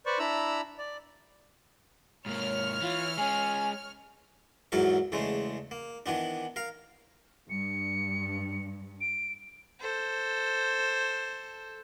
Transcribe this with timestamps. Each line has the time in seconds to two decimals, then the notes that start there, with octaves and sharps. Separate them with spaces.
0.06 B4 C5 D5 C#6
0.19 D4 E4 A#5 B5 E6
0.78 D5
2.26 G#2 A#3 C#5 F6
2.81 E3 F4
3.18 G#3 C#4 G#5
4.72 E2 G#2 F#3 E4 A4 A#4
5.12 E2 C#3 G#3 A3
5.71 A#3
6.06 D#3 E3 B3 D4
6.56 A#4 F5
7.50 G2 C#7
9.01 D7
9.80 A4 C5